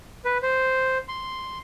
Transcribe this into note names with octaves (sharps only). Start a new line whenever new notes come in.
B4
C5
C6